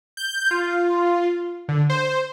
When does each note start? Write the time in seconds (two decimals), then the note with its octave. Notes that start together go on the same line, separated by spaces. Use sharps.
0.17 G6
0.51 F4
1.69 D3
1.90 C5